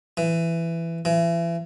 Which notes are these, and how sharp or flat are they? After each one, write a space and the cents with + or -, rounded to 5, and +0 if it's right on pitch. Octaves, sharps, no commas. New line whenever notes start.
E3 +15
E3 +35